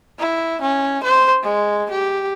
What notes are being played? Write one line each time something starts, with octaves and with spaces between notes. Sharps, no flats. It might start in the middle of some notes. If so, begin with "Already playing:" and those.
E4
C#4
C5
G#3
G4